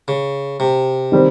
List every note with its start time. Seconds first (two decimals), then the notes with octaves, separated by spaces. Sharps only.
0.08 C#3
0.60 C3
1.12 D#3 G3 C4